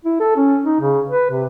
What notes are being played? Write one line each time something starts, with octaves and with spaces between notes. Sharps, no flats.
E4
A4
C#4
D#4
C#3
B4
C3